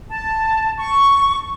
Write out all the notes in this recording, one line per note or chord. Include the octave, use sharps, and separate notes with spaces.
A5
C#6